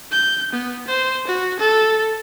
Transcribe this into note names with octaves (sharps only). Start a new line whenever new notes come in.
G6
B3
C5
F#4
A4